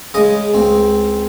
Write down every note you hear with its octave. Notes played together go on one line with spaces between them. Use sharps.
C#3 G#3 D#5 D#6
C#2 C4